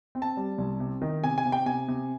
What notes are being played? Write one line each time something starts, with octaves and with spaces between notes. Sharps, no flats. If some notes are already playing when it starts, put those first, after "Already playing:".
C4
A5
G3
C2
C3
D#3
C3 G#5
G#5
C3
G5
C3 G#5
C3